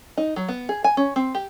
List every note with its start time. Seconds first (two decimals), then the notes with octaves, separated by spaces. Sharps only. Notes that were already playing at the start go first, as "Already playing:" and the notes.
0.17 D#4
0.36 F#3
0.48 B3
0.69 G#4
0.84 G#5
0.97 C#4
1.16 C4
1.35 G4